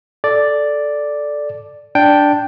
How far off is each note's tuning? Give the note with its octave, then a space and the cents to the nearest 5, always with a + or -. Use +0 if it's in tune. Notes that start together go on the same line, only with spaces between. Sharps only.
A4 -5 D5 +0
D4 +0 G5 +0